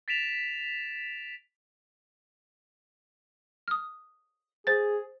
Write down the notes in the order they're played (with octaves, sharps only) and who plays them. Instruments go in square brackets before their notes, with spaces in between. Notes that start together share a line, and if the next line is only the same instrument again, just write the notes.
[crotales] A6 B6 D7 E7 F7
[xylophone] D#6 F6
[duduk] G#4 [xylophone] C5 A6